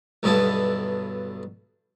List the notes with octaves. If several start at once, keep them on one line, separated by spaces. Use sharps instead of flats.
B1 G2 D3 B3 E4 A5